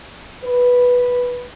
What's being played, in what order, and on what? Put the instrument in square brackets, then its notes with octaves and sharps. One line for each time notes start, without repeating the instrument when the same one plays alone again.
[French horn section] B4